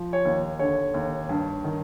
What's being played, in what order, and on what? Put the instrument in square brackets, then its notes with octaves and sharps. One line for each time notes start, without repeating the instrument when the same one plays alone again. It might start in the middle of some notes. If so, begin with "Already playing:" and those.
Already playing: [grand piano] F3
C#5
D#2
D3 C#5
D#2
G2
D#3